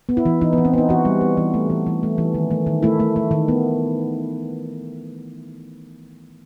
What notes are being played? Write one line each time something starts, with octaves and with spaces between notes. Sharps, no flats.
B3
E4
E3
E3 D#4
B3
E3
C4
B3 D#4
E3 F#4
G3
B3
E3
A3
E3
E3
A3
E3
D#3
A3
D#3
A3 E4
A3
A3
D#3
B3